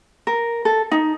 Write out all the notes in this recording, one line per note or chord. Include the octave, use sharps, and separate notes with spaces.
A#4
A4
D#4